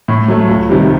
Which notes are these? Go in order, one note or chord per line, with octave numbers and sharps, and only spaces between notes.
A2
F#3 A3
C#2
C3 D#3 G3